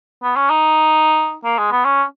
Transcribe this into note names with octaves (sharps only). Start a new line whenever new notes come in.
B3
C#4
D#4
A#3
G#3
B3
C#4